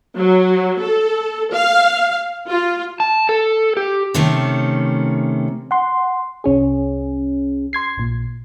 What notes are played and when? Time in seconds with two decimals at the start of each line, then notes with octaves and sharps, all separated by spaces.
0.17 F#3
0.82 A4
1.54 F5
2.50 F4
3.00 A5
3.29 A4
3.77 G4
4.14 C3 D#3 A3 C#4
5.71 F#5 C6
6.44 C2 C#4 G#4
7.73 C6 G#6 C7
7.97 A#1 A#2